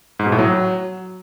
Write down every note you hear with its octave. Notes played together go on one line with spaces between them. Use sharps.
G#2
B2
A2
F#3